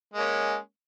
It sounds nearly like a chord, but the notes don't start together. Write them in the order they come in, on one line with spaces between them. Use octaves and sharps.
G#3 A#3 C#4